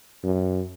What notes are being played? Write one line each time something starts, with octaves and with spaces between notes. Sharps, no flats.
F#2